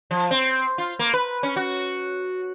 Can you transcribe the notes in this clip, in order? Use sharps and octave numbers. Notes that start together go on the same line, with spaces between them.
F3
C4
F4
A#3
B4
C#4
F#4